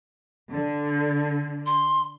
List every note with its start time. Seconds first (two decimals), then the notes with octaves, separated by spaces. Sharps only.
0.51 D3
1.66 C6